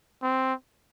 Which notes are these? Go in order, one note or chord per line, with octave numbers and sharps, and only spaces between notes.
C4